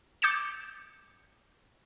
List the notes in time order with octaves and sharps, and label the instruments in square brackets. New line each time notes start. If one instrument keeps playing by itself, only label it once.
[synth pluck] D6 G6 A6 C#7 E7